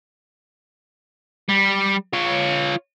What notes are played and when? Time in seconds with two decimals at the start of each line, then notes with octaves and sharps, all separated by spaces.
1.49 G3
2.13 F4 C#5